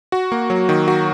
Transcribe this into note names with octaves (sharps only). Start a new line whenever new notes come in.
F#4
A#3
F#3
D#3
F#4